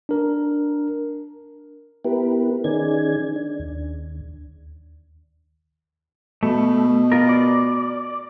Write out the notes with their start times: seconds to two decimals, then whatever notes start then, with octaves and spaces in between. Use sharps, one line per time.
0.09 D4 A#4
2.05 B3 E4 G4 A#4 B4
2.64 D#3 C#4 D#4 G#4 D5 G#6
3.36 D4
3.59 D#2
6.43 B2 A3
7.12 F4 A#4
7.29 D5